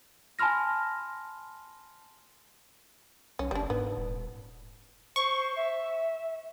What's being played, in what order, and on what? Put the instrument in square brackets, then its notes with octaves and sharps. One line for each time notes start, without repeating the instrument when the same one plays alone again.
[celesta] G#5 A5 B5 C6 F6 A#6
[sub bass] B1 [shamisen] C#4
[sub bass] F#1 [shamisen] G3 D4
[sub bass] G#2 [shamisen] B3
[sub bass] D#1
[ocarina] C5 [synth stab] C#6
[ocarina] E5